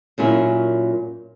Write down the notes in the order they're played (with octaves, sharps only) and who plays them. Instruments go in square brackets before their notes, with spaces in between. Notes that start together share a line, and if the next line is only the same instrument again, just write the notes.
[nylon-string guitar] F#2 A#2 C#4 E4